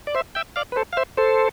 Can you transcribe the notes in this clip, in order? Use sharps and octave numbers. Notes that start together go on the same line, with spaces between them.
D5
C5 E5
E5 G5
D5 F5
B4
A4 C5
F5
C5 E5
A4 C5